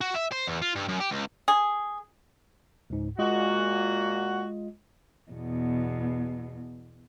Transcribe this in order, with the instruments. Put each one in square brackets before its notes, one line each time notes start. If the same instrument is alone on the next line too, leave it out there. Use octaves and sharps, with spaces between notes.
[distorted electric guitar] F#4
E5
C5
E2
F4
G2
F#2
G4
C#2
[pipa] G#4
[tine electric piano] C#2 G#2
[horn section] A#2 F#4 [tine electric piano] G#3 F4 D#5
[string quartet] E2 B2